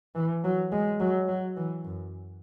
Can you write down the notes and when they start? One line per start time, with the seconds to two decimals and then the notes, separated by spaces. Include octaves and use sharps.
0.15 E3
0.44 F#3
0.72 G#3
1.00 F#3
1.28 F#3
1.56 E3
1.84 F#2